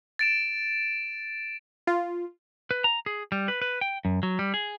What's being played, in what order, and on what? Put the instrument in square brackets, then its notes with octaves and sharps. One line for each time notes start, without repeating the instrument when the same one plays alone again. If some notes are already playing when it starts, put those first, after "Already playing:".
[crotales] A6 D7 E7
[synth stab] F4
[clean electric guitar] B4
A#5
G#4
G3
B4
B4
G5
F#2
F#3
G3
G#4